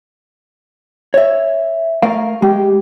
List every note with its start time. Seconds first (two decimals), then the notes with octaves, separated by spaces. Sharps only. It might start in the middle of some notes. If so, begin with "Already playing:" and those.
1.14 C#5 E5
2.02 A3 A#4 F5
2.42 G#3 G4